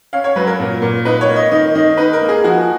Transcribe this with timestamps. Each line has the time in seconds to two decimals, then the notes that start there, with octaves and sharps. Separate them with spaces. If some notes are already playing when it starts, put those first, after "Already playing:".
0.13 C#4 F5
0.24 C#5
0.36 F#3 B4
0.47 A#4
0.59 A#2
0.82 A#2
1.05 D#4 B4
1.21 C#5
1.29 A#3
1.36 D#5
1.51 D#3 D#5
1.75 D#3 D#5
1.97 D#4 B4
2.13 A#4
2.21 A#3
2.29 G#4
2.44 F3 F#4